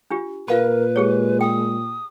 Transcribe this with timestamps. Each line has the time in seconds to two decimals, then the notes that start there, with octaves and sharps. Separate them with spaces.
0.11 D4 F4 G4
0.48 A#2 F4 A#4 B4 F5 B5
0.96 G#3 G4 G#4 C#5
1.41 G5 D#6